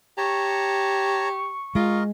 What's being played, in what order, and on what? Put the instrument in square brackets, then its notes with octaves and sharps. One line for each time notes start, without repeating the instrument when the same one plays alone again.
[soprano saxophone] G4 [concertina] C#5 A5 A#5 [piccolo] C#6
[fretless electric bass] G#3 [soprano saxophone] F4 [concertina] A#4 D#5